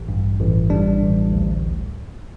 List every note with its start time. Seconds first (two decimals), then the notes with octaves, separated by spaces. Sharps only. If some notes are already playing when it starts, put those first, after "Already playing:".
Already playing: A1
0.09 G2
0.39 A1
0.70 G3 D4
1.01 A1
1.32 D2